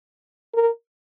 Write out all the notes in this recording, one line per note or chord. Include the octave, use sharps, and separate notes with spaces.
A#4